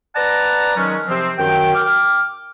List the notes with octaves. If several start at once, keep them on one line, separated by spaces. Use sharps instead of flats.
B4 D5 F#5 A5 A#5
D#3 F#3 G#3 C#4
C3 F3 C4
F#2 D#3 G5
G5 D6 F6